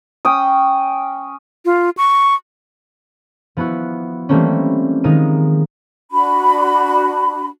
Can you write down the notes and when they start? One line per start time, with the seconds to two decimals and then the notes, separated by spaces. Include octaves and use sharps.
0.25 C#4 G5 D#6
1.65 F4
1.97 C#6
3.57 F3 B3 E4 F#4
4.29 E3 G3 A3 A#3 C4 C#4
5.04 D#3 F3 G#3 D#4 A#4 D#7
6.12 D4 F#4 B5